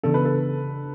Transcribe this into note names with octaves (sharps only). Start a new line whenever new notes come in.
C#3 E3 B3 D4 A4
B4
A4